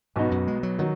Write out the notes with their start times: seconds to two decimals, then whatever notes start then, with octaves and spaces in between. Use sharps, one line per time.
0.16 B1 G#2 B2 B3 D#4 F#4
0.31 F#2
0.47 G#3
0.63 F#3
0.78 D#3 F#3 D#4 F#4